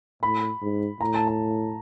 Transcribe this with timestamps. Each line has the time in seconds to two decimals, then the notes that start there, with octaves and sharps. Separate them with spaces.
0.23 A2 B5
0.62 G#2
1.01 A2 A#5
1.14 A5
1.27 A5